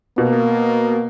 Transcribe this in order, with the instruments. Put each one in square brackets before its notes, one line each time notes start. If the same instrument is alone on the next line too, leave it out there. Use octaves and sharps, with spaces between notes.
[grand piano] B2 [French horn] A#3